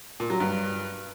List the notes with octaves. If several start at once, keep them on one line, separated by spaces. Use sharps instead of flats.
A#2
F#3
G2